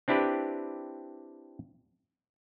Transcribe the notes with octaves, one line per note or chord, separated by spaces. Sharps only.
C4 D4 E4 G4 B4 D5